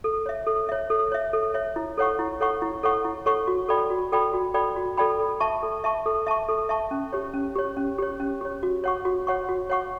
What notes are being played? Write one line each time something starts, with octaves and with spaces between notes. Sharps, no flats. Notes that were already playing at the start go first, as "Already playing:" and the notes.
A4
C#5 E5
A4
C#5 E5
A4
C#5 E5
A4
C#5 E5
E4
A4 C#5 F#5 C#6
E4
A4 C#5 F#5 C#6
E4
A4 C#5 F#5 C#6
E4
A4 C#5 F#5 C#6
F#4
A4 D5 G5 B5
F#4
A4 D5 G5 B5
F#4
A4 D5 G5 B5
F#4
A4 D5 G5 B5
A4
E5 A5 C#6
A4
E5 A5 C#6
A4
E5 A5 C#6
A4
E5 A5 C#6
C#4
G4 C#5
C#4
G4 C#5
C#4
G4 C#5
C#4
G4 C#5
F#4
C#5 F#5 C#6
F#4
C#5 F#5 C#6
F#4
C#5 F#5 C#6